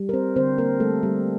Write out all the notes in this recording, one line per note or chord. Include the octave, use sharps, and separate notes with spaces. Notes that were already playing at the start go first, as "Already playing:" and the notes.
Already playing: G3
A#4
C4 C5
D3 C4 C5
A#3 A#4
G3 A3 A4
G3 G4